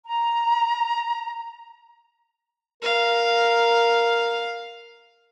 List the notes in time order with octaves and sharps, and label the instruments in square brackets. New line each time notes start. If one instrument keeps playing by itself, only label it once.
[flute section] A#5
[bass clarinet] A#4 [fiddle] F5